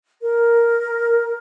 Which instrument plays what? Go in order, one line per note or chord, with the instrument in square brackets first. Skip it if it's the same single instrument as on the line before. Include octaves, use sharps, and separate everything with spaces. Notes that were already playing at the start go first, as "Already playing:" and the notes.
[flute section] A#4